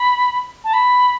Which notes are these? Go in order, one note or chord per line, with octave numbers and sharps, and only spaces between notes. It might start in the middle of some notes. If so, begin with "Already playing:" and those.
Already playing: B5
A5
B5